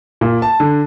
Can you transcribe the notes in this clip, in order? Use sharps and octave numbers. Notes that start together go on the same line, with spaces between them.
A#2
A5
D3